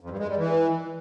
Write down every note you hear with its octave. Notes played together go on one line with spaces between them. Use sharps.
F2
G2
G#3
G3
E3